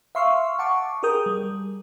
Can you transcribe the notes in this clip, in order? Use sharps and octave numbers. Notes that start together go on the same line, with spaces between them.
E5 F5 C6 C#6 E6 F6
F#5 A5 C#6 D6
G4 G#4 A#4 D#6 G6
G3